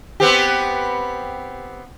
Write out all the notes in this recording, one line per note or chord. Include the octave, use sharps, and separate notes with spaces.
B3 C4 G4